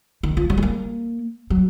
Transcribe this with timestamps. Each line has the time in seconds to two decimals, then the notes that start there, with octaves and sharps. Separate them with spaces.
0.23 D#3
0.37 F3
0.50 F#3
0.57 G#3
0.63 A#3
1.50 F#3